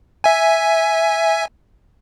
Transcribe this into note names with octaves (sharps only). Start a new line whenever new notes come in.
E5 G#5